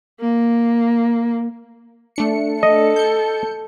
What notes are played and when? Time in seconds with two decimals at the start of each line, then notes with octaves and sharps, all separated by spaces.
0.20 A#3
2.16 A3 D4 C#7
2.63 A4 D#5
2.96 G6 C#7